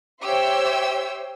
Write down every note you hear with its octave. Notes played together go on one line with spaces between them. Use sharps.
G4 C5 C#5 E5 G5 E6